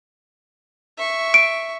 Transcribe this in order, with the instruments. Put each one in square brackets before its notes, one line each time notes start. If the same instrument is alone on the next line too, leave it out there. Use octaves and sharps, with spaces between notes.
[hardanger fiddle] E5 C#6
[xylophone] D7